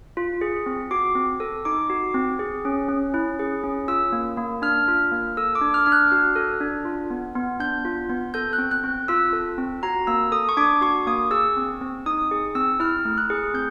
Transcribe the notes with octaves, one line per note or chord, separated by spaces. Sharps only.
F4
G#4
C4
F#4 D6
C4
A4
D#4 D6
F#4
C4
G#4
C#4
C#4
E4
G#4
C#4
F4 E6
A#3
A#3
D4 F6
F4
A#3
A4 E6
D6
D4
F6
D4 F6
F#6
F#4
A4
D4
F4
B3
B3
D4 G6
F4
B3
A4 G6
F#6
C4
F#6
C4
F4 E6
A4
C4
F#4 A#5
A#3 E6
A4 D#6
C#6
D4 D6
F#4 C#6
A#3 D#6
G#4 E6
C4
C4
D#4 D#6
G#4
C4 E6
E4 F6
A3
F#6
G#4
C4 G6